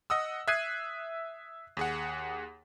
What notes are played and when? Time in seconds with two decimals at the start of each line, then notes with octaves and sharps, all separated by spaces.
0.10 D#5 F#5 D#6 E6
0.48 E5 D#6 F#6 G#6 C7 D#7
1.77 D#2 G#4 F#5